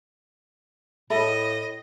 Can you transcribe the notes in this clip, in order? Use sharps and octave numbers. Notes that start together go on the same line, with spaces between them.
A2 A4 D#5 E5 B5